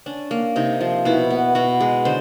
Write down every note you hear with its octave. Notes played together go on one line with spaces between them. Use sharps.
C#4 D4
A#3
C3 D#4
F3
B2 E4
B3
B2 F#4
G#3
D3 C5